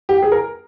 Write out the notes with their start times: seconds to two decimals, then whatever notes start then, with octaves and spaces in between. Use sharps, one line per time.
0.09 G4
0.22 G#4
0.32 A#4